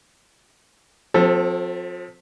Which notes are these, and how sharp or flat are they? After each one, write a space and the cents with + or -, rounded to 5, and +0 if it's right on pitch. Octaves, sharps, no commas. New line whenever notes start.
F3 +40 C4 +0 A4 +0